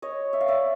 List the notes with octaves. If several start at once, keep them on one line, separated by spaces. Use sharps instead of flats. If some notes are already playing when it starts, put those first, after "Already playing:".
C#5 D#5
E5
F5
D5 E5